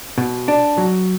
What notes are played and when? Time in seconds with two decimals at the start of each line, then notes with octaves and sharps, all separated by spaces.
0.18 B2
0.48 D4
0.78 F#3